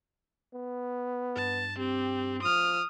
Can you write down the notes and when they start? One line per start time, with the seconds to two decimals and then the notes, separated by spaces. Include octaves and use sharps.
0.55 B3
1.36 G2 A5
1.79 C4 G4
2.43 F3 D#6 F6